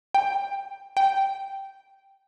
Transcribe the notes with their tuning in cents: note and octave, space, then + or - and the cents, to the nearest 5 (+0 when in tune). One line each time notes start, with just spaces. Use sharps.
G5 +10
G5 -5